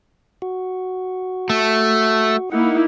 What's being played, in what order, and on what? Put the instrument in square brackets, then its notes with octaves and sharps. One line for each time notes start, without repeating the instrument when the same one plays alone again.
[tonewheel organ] F#4
[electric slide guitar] A3
[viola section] A#3 D#4 E4 [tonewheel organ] F#5